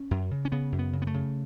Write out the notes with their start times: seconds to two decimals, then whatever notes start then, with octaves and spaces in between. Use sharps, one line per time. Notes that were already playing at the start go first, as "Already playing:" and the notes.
Already playing: C#4
0.11 F#2
0.31 C#3
0.45 C#4
0.52 C#3 B3
0.72 F#2
0.79 B3
0.93 C#3
1.02 B3
1.07 A3
1.14 C#3